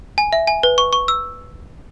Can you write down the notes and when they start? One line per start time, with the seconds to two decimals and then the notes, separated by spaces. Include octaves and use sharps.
0.18 G#5
0.33 E5
0.47 G#5
0.63 B4
0.78 C#6
0.93 C#6
1.08 E6